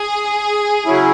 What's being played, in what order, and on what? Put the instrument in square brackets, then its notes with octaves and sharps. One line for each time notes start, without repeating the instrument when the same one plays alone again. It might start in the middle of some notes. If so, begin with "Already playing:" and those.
Already playing: [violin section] G#4
[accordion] C#3 F#3 C#4 E4